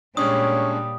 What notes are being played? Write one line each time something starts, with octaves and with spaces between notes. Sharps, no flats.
A#2 G3 G#3 C#4 D4 C#5 D#6